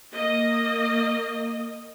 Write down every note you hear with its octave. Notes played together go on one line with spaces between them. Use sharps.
A#3 D#5